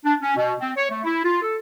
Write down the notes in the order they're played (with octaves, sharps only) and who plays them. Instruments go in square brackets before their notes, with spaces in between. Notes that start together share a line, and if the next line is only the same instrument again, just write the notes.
[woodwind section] D4
C#4
B2
C4
C#5
A3
E4
F4
A4